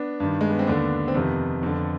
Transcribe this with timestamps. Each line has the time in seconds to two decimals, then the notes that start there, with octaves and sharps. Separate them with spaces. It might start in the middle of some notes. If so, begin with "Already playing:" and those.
Already playing: B3 D4
0.20 G2 D#3
0.41 G#3
0.50 B3
0.59 C4
0.67 D#2 D3 B3 D4
1.08 C4
1.15 F2 C3 D#3 B3
1.63 F2 D3